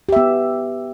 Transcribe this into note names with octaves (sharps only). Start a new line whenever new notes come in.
B3 G4 E5